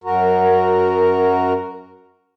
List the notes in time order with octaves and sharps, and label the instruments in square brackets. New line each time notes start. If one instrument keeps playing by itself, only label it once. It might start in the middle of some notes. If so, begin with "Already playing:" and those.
[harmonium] F#2 F#4 A#4